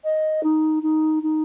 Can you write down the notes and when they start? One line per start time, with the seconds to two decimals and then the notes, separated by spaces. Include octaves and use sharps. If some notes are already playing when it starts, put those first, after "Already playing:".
0.04 D#5
0.43 D#4
0.82 D#4
1.23 D#4